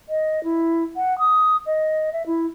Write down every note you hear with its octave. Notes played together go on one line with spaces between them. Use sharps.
D#5
E4
F#5
D#6
D#5
E5
E4